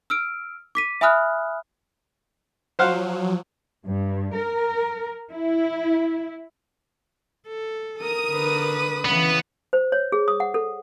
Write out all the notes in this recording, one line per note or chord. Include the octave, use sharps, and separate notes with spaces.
E6 F6 D7
D6 B6 D#7
E5 G#5 B5 D#6 F6 F#6
F3 F#3 C5 F5 F#5
G2
A#4
E4
A4
A#4 D#6
D3 B4
C#3 E3 B3
C5
C#5
G#4
D#6
F#5
A4